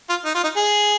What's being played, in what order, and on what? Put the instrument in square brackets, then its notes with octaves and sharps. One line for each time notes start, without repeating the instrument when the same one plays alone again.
[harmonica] F4
D#4
F4
D#4
G#4